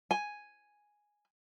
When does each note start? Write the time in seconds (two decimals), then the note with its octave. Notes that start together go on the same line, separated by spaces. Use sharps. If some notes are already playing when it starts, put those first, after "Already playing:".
0.11 G#5